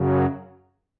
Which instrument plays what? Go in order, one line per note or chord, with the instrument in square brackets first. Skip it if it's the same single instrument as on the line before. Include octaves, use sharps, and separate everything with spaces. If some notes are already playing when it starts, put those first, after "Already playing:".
Already playing: [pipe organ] F#2 C#3 F#3